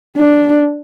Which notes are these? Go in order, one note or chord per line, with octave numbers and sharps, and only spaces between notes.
D4